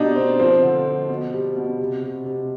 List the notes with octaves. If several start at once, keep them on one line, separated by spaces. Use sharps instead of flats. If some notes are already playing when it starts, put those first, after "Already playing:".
Already playing: B2 G3 D4 D#4
B2 C4
F3 C4
D3
F3
B2
G3
B2
C3
C3
C3